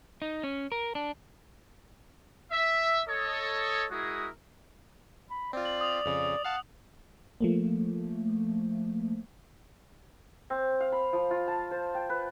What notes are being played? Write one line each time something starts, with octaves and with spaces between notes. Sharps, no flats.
D#4
C#4
A#4
D4
E5
A4 C#5 D#5
G#3 E4 F#4 G#4 A#4 D#6
B5
C4 F4 D5
F#7
D#6
F2 C#3
F5 F#5 A5
F3 A3 A#3
C4
F5
B5
F3
F4
A5
C5
G5
B4